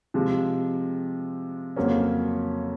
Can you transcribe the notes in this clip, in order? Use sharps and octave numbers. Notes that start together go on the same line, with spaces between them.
C3 F3 G#3
F2 C#3 F#3 A#3 C#4